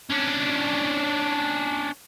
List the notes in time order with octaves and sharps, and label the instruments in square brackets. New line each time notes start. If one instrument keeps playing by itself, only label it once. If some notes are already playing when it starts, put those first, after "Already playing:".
[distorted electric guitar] C#4 D4